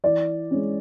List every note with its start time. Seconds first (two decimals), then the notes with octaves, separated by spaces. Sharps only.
0.04 E3 D5
0.51 G#3 C#4